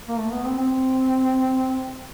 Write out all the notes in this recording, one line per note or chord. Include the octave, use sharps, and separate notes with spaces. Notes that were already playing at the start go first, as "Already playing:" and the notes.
A#3
A3
B3
C4
C4